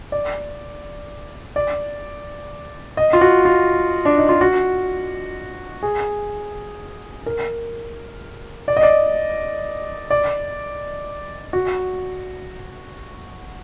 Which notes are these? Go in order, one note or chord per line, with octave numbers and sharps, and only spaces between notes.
D5
D5
D#5
F4
F#4
F4
D4
D#4
F4
F#4
G#4
A#4
D5
D#5
D5
D5
F#4